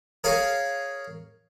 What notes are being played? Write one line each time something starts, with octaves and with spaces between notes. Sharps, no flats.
G#4 A#4 C#5 F5